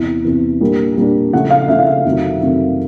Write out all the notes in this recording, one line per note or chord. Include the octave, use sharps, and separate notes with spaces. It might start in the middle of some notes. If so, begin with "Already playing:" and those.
Already playing: E2 C3 E3
E2 C3 E3
A#2 G3 A#3 D4
A#2 G3 A#3 D4
C#3 F3 A3 C#4 E4 F#5
F5
C#3 F3 A3 C#4 E4 E5
F5
E5
F2 C3 D#3 F#3 A3
F2 C3 D#3 F#3 A3